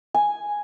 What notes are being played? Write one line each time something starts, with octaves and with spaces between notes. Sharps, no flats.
G#5